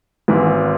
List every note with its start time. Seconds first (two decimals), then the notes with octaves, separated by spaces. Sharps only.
0.28 G#1 G#2 E3